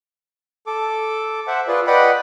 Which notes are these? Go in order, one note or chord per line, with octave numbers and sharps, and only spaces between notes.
A4 D6
C5 E5 F#5
F4 G#4 B4 D5
B4 D5 D#5 F#5 G5 B5